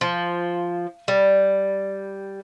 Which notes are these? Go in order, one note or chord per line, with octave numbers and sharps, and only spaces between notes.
F3
G3